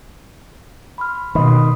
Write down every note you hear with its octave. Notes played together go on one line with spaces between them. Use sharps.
B5 C6 F6
B2 D#3 B5 C6 D#6